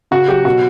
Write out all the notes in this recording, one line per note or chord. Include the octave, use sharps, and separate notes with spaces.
C#3 F#4
F#3 G4
B2 F#4